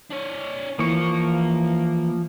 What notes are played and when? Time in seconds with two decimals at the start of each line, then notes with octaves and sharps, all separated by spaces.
0.11 D4 C#5
0.79 E3 F3 A#3 C#6